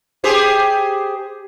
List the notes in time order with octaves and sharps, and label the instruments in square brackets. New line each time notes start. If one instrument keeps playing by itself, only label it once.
[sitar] G4 G#4 C5